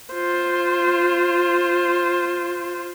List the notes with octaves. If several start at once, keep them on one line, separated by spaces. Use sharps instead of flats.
F4 C5